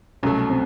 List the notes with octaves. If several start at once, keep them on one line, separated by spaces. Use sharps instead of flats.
C2 B2 F#3 A3 C#4
C4